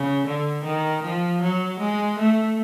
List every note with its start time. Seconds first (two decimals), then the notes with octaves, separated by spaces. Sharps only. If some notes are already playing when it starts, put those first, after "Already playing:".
Already playing: C#3
0.27 D3
0.65 D#3
1.04 F3
1.42 F#3
1.80 G#3
2.19 A3